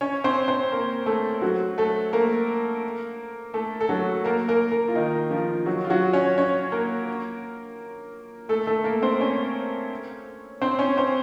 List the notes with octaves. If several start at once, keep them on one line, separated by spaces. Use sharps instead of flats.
C#4 C#5
C4 C5
C4 C5
A#3 A#4
A3 A4
F#3 F#4
A3 A4
A#3 A#4
A3 A4
A4
F#3 F#4
A#3 A#4
A#3 A#4
A#3 A#4
F4
D#3 D#4
F3 F4
F#3 F#4
F4
F#3 F#4
C#4 C#5
C#4 C#5
A#3 A#4
A3 A4
A3 A4
A#3 A#4
C4 C5
C#4 C#5
C4 C5
C#4 C#5
C4 C5